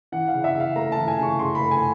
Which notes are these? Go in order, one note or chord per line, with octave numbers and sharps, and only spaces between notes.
E3 F#5
F5
C#3
E5
C#3
F5
A3 A#5
A5
E3
G#5
C#3 C#6
C#3 C6
B5
A3
G#5